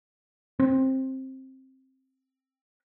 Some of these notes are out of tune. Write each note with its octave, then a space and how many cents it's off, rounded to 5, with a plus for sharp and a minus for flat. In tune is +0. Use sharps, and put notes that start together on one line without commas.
C4 +15